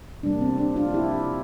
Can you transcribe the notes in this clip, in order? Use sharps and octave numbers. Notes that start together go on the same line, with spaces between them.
C3 G3 A#3 D4
C4
D4
D4 F4
E4 G4